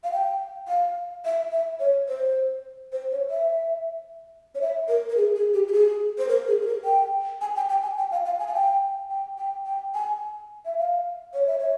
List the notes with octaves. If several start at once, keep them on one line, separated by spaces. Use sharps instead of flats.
F5
G5
F5
E5
E5
C#5
C5
C5
C#5
E5
C#5
E5
A#4
A#4
G#4
G#4
G4
G4
G#4
C5
A#4
G#4
G#4
A#4
G5
G#5
G5
G5
G#5
G5
F5
F5
G#5
F5
G5
G5
G5
G5
G#5
E5
F5
C#5
E5
C#5